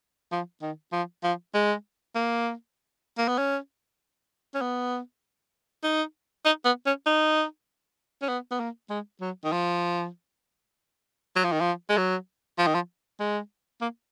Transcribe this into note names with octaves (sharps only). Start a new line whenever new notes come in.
F3
D#3
F3
F3
G#3
A#3
A#3
B3
C#4
C#4
B3
D#4
D#4
B3
C#4
D#4
C#4
B3
B3
A#3
G#3
F#3
D#3
F3
F#3
F3
D#3
F3
G#3
F#3
F3
D#3
F3
G#3
A#3